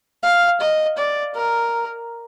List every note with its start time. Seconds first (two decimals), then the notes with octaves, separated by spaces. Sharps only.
0.23 F5
0.60 D#5
0.97 D5
1.34 A#4